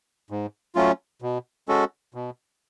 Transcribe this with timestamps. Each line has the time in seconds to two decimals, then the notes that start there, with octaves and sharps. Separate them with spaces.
0.30 G#2
0.75 F#3 A3 C#4 F4
1.22 B2
1.68 G#3 C#4 F#4 A4
2.14 B2